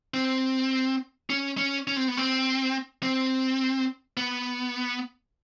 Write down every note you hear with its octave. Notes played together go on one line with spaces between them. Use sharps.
C4
C#4
C#4
C#4
C4
B3
C4
C4
B3